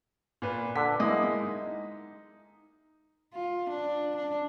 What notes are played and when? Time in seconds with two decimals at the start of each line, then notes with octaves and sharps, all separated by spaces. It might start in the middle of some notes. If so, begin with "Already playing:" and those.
0.42 A#2 B4
0.76 D3 B6
1.00 G#3 A#3 E4 D#5
1.43 D#4
3.34 F4
3.70 D4
4.16 D4